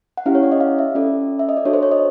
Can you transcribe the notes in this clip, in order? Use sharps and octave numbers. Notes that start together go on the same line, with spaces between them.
F#5
C#4 E4 G4 F5
C#5
D5
D#5
F5
E5
C#4 F4 A4 D5
E5
D#5
D5
D4 F#4 A4 C#5
C5
C#5
D#5